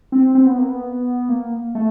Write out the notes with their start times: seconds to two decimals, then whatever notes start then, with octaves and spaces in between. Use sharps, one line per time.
0.12 C4
0.35 C4
0.46 B3
0.58 A#3
0.68 B3
1.29 A#3
1.75 A3